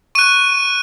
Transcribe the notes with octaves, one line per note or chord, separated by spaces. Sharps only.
C#6 F#6 D#7